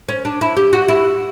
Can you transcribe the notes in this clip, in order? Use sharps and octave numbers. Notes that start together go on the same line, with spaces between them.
C#4
D4
E4
G4
F#4
E4